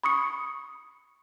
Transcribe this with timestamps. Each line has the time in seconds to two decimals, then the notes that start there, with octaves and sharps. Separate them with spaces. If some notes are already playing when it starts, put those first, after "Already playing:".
0.03 B5 C#6 D#6 C#7